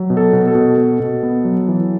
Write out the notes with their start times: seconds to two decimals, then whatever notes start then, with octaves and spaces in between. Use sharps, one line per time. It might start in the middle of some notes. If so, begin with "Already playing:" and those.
Already playing: F#3
0.10 B2
0.17 A4
0.33 B2
0.47 A4
0.55 B2
0.78 B2
1.00 B2
1.23 B3
1.45 F#3
1.68 E3